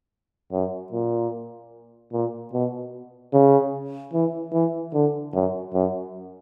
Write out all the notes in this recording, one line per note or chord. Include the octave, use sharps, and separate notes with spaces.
F#2
A#2
A#2
B2
C#3
E3
E3
D3
F#2
F#2